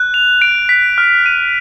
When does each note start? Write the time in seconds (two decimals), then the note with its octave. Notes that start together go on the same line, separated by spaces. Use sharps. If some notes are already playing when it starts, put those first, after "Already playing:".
Already playing: F#6
0.14 F7
0.42 D7
0.69 B6
0.98 F6
1.26 D#7